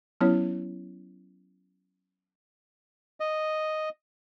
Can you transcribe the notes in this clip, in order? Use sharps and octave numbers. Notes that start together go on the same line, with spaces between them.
F#3 B3 C#4 E4 C#5
D#5